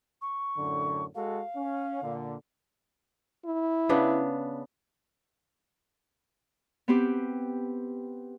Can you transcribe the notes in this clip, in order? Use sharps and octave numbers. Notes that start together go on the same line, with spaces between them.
C#6
F#2 A2 D3
G#3 F#4 A4 F5
C#4
A#2 D3
E4
C#3 B3 D4
B3 C4 G4